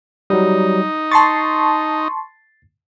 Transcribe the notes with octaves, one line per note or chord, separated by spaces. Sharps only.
F#3 G3 D#4
A5 C6 C#6 A6 C7